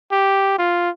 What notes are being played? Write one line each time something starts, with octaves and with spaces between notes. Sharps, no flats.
G4
F4